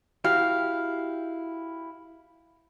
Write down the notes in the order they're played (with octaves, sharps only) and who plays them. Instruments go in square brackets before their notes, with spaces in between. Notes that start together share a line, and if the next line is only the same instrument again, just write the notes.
[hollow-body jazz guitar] E4 F#4 G4 [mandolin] F5